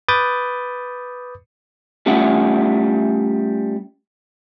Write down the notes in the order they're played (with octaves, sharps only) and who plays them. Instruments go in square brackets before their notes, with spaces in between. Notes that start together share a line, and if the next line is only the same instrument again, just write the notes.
[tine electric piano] B4 B5 D6 D#6 G6 A6
[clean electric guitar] G3 A3 C#4 F4 E5 F#5